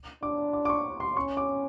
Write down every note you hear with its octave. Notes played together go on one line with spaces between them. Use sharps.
D4 D6
D6
D6
C#6
C6
C#4 C#6
D6